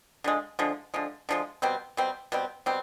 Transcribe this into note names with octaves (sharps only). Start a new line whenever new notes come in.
D3 F3 G#3
D3 F3 G#3
D3 F3 G#3
D3 F3 G#3
B2 G3 C4
B2 G3 C4
B2 G3 C4
B2 G3 C4